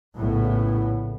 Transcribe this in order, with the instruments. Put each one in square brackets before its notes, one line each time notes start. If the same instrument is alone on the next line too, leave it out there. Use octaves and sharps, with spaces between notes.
[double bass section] A#1 A2 C#3 B3